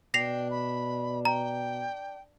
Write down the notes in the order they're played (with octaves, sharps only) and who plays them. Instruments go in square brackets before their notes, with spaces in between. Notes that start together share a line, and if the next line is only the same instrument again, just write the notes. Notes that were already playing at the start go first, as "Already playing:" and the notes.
[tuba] B2 [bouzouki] D4 [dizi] G5 [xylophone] A#6 C7 F7
[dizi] B5
[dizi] G5 [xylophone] A#5